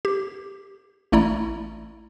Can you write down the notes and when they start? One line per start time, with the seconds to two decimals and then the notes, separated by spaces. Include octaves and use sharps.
0.05 G4
1.12 A1 A3 E4 D5 A#5 B5